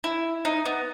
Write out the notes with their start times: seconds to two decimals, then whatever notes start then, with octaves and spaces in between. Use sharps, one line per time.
0.04 E4
0.45 D#4
0.65 B3